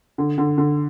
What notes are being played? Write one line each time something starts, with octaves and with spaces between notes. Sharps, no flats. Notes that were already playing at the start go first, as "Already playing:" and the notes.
D3
D3
D3